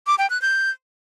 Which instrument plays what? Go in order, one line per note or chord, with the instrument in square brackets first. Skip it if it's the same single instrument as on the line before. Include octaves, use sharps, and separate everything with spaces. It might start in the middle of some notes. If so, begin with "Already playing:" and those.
[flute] D6
G5
F#6
G6